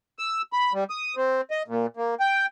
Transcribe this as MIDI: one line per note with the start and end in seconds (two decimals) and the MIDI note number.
0.19 0.42 88
0.53 0.73 83
0.73 0.84 55
0.90 1.15 87
1.16 1.41 60
1.51 1.62 75
1.68 1.86 46
1.97 2.15 58
2.20 2.46 79